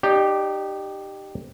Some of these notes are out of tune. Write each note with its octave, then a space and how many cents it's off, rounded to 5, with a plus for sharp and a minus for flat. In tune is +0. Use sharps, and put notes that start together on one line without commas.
D#4 -30 G4 +0 D5 -10